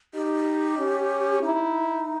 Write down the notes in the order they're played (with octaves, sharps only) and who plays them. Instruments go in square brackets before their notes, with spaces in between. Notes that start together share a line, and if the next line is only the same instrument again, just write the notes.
[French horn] D#4 [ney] G4
[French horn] C#4
[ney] D#4 [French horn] E4